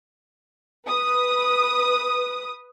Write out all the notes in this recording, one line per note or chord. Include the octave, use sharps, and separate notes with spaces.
B4 D#6